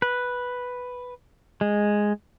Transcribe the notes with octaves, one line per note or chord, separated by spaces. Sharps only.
B4
G#3